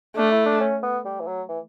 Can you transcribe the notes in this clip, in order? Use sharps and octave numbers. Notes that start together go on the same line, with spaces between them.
A3 D4
E4
D4
C#4
B3
G3
E3
F#3
E3